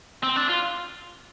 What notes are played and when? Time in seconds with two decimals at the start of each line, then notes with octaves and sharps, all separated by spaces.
0.24 C4
0.36 D4
0.49 F4